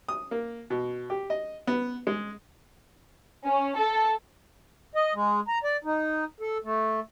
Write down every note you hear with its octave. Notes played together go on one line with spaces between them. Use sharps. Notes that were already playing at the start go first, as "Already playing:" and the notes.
D#6
A#3
B2
G4
D#5
B3
G#3
C#4
A4
D#5
G#3
A#5
D5
D#4
A4
A3